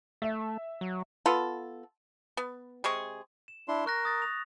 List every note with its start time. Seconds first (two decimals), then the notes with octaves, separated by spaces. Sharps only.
0.22 A3 E5
0.81 F#3
1.26 B3 F4 A4
2.37 B3
2.84 C3 G#3 G#4 C#6
3.48 E7
3.68 D4 E4 C6
3.86 A#4 C#6 F#6 A#6
4.05 D#6 A6 A#6
4.22 F7